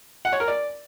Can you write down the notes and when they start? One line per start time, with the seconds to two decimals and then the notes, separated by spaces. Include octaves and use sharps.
0.25 F#5
0.32 C#5
0.40 A#4
0.48 D5